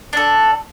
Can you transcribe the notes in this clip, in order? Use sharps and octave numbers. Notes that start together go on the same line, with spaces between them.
D4 A4